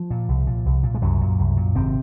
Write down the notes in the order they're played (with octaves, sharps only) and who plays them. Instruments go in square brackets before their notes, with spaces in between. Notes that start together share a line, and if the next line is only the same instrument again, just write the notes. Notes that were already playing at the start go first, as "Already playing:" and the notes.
Already playing: [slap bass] F3
A#2
C2
A#2
C2
A#2
G#3
C2 F#2 F#3
A#2
C2
A#2
G#1 C3 C4